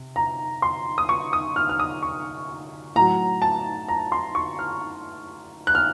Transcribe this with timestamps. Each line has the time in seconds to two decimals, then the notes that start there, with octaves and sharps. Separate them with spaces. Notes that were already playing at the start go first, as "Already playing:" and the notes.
Already playing: C3
0.16 A#5
0.62 C6
0.98 D#6
1.09 C#6
1.33 D#6
1.56 F6
1.69 F6
1.79 D#6
2.03 C#6
2.96 A2 F#3 A#5
3.42 A5
3.88 A#5
4.12 C6
4.35 C#6
4.59 F6
5.67 F#6
5.75 F6